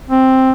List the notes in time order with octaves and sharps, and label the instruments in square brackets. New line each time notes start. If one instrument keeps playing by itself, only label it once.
[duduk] C4